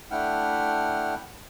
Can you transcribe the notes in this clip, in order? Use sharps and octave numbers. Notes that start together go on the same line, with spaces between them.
A3 D4 E4 F#5 G5 F6